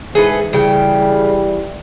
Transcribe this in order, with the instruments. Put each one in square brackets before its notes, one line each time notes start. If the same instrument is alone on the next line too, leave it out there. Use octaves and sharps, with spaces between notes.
[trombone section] G#2 E3 [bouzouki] G#4 A4 B4
[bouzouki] C#3 G5 [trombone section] E3 G3